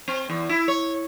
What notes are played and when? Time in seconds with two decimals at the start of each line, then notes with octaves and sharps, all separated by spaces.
0.08 C4
0.30 E2
0.49 E4
0.68 C#5